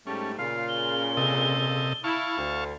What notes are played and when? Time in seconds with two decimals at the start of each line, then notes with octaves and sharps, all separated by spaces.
0.07 G#2 G3 A3 C#4
0.39 A#2 C#3 F4 C7
0.69 G7
1.17 C3 A4 D#5
2.04 E4 F5 A5 C#6
2.38 D2